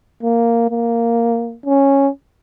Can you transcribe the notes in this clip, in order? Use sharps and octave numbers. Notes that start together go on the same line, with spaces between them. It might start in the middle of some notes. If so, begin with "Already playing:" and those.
A#3
A#3
C#4